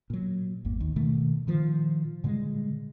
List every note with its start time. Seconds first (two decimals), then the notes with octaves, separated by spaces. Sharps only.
0.10 A#2 F#3
0.65 G#1 E2 A#3
0.81 D#2
0.96 B2 D#3 A3
1.47 A#2 D#3 F3
2.24 A#2 D3 G3 G#3